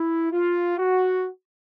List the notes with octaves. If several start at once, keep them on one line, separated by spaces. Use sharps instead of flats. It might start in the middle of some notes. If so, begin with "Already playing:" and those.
Already playing: E4
F4
F#4